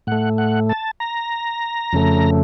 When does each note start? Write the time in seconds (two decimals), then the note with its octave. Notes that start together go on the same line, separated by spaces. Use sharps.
0.07 A2 A3 F#5
0.38 F#5
0.69 A5
1.00 A#5
1.93 F2 C#3 A3